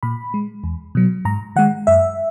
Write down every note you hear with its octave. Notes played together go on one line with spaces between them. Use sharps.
A#2 B5
G#3
E2
B2 F#3
G#2 A#5
D#3 G#3 F#5
F#2 E5